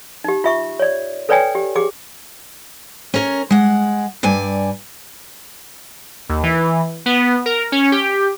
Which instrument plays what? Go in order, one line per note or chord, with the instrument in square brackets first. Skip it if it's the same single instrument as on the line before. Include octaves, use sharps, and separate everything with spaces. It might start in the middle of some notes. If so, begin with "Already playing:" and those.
[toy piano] D#4 G4
F4 E5 C#6
C#5 D5
A4 B4 C#5 D5 G5 G#5
G4
G4 G#4 D6
[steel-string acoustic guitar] C#4 A#4 C#5
G#3 F#5
G2 D5 G#5
[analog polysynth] D#2
E3
B3
A#4
C#4
G4